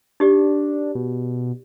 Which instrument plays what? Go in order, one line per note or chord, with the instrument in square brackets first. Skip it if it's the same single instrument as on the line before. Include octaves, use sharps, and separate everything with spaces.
[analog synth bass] D4 [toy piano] D#4 G4 D5
[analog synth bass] B2